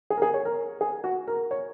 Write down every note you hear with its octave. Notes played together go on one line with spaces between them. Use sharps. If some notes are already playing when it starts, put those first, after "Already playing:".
G#4
A#4
G#4
C#5
A#4
G#4
F#4
A#4
C#5